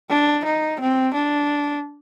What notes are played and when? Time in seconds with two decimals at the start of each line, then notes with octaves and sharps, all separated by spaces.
0.10 D4
0.45 D#4
0.80 C4
1.14 D4